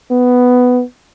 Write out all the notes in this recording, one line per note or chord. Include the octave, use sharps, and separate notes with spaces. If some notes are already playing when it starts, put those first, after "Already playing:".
B3